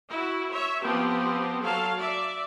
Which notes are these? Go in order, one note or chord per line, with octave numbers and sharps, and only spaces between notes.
E4 F#4
C#5 E5
F3 B3 C4 G4
F#3 A4 F5 A5
D5 E5